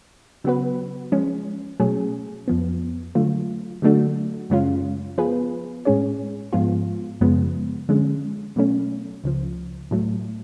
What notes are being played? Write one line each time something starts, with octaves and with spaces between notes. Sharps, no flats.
C#3 F#3 B3 F#4 B4
F3 G#3 C#4
B2 F#3 A3 C#4 G#4
F2 F3 B3
D3 F#3 A3 F4
D3 F#3 A3 D4 F#4
F#2 C#3 G#3 C#4 F4
F3 B3 F4 G#4 B4
A2 G#3 C#4 G#4 C#5
G#2 F3 G#3 B3 F4
F#2 C#3 F3 G#3 B3
D3 F3 G#3 C#4
B2 F#3 A3 C#4
C#2 C#3 F3
A2 F#3 A3